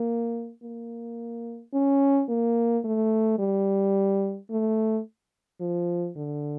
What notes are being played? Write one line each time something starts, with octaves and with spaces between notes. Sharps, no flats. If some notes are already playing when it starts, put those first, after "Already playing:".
Already playing: A#3
A#3
C#4
A#3
A3
G3
A3
F3
D3